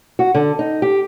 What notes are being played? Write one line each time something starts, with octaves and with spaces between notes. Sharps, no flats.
F#4
D3
D#4
G4